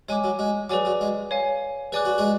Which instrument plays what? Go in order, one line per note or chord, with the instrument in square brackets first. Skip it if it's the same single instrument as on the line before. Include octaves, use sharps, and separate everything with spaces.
[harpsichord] G#3 [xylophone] C#5 G#5 D6
[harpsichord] F#3
G#3
[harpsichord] F#3 [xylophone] G#4 B4 D5 G#5 D6
[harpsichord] F#3
G#3
[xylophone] C#5 F5 G#5
[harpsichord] G#4 [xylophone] B4 D5 G#5 D6 F#6
[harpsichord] F#4
G#3 G#4